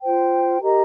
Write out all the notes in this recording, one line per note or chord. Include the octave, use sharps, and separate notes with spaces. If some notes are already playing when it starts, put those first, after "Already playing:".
F4 C5 G5
G4 A#4 D#5 A#5